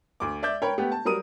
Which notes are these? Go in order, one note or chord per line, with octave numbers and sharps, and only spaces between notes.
D2 D6
D5 E5 D6 G6
A#4 C#5 G5 B5
A3 B3 G4
A5
F#3 G3 A#4 D#6 D#7